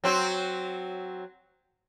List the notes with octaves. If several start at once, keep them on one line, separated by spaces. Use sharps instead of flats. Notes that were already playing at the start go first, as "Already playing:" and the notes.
F#3 C4 F#4